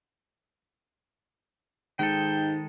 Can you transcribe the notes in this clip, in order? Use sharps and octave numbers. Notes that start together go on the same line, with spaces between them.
G#2 D#3 G#3 A4 G5